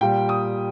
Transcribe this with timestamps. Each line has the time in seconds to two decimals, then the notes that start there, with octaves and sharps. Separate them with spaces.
0.01 A#2 G3 G5
0.29 D#6